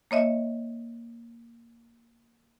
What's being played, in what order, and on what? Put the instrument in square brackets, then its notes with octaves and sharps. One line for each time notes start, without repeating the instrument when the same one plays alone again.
[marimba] A#3 C#5 D#5 E5